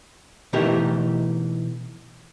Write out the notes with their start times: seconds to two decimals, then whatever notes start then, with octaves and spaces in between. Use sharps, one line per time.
0.53 B2 E3 A3 D#4 G4 A#4